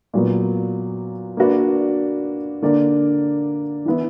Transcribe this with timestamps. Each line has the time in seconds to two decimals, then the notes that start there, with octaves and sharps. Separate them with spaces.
0.14 A#2 F#3 B3
1.37 A#3 D4 F#4 B4 D5
2.62 D3 A#3 D4 A#4 D5
3.85 E3 B3 E4